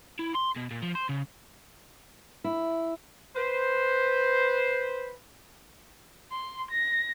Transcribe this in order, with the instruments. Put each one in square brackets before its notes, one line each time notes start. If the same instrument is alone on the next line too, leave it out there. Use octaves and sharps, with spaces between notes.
[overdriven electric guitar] E4
C6
B2
A#2
F3
C5
C#3
[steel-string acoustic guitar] E4
[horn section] B4 C5
[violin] C6
A#6